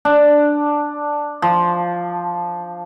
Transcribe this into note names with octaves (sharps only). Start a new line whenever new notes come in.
D4
F3